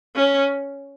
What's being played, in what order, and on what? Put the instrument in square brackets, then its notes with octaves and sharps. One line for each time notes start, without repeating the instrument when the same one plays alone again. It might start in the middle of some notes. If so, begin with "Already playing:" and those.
[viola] C#4